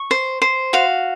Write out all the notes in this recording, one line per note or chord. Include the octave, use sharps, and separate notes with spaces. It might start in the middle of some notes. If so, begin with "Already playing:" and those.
Already playing: C#6
C5
C5
F#4 F5